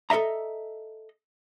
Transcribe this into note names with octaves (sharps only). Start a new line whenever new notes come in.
A4 A#4 D#5 E5 A#5